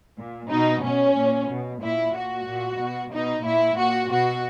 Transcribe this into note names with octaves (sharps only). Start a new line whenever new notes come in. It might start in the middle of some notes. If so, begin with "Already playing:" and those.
A#2
B2 D#4
B2 C#4
A#2
B2
A#2 E4
A#2 F#4
A#2
B2
B2 D#4
A#2 E4
A#2 F#4
B2 F#4